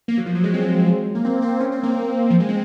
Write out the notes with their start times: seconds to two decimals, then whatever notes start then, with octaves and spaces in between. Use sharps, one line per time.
0.08 A#3
0.18 F#3
0.26 F3
0.35 F#3
0.44 G#3
0.54 C4
1.15 A#3
1.25 C4
1.42 C4
1.60 C#4
1.72 C4
1.83 A#3
2.30 F3
2.40 G#3
2.49 C4